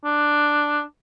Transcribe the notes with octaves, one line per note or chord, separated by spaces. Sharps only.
D4